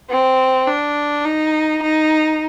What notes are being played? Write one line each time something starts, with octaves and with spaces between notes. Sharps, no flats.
C4
D4
D#4
D#4